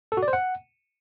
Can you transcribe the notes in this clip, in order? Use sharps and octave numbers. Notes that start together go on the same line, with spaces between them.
A4
F#4
D5
C5
F#5